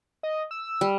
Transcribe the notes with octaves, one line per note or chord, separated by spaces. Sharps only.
D#5
E6
G3